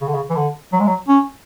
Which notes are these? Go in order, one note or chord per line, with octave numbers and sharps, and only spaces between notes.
C#3
D3
C#3
E3
D3
F#3
G#3
F#3
C#4